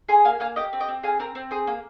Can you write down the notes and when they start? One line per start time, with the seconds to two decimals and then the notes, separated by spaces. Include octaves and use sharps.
0.09 G#4 G#5 C6
0.25 A#3 F5 G#5
0.40 A#3 F5 G#5
0.56 G4 D#5 G5
0.73 C4
0.80 D#5 G5
0.88 C4
1.03 G#4 F5 G#5
1.19 C4 A#4
1.35 C4 C5
1.51 G#4 C5
1.67 A#3